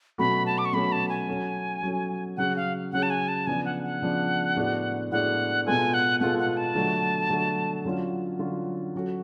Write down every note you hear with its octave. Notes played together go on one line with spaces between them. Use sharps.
B2 F#3 A3 C#4 F#4 B5
A5
D6
C#6
B2 F#3 A3 C#4 F#4 B5
A5
G#5
F#3 C#4 F#4 A4
F#3 C#4 F#4 A4
C#3 F#3 C#4 G#4 F#5
F5
C#3 F#3 C#4 G#4 F#5
A5
G#5
A5
C#3 F3 B3 D4 G#5
F#5
F#5
C#3 F3 B3 D4
A2 G#3 B3 D4 F#4
A2 G#3 B3 D4 F#4 F#5
B2 G#3 B3 F4 A4 G#5
F#5
B2 G#3 B3 F4 A4 F#5
F#5
A5
D3 F#3 A3
D3 F#3 A3
D3 F#3 C#4 F4
D3 F#3 C#4 F4
F#3 C#4 F#4 A4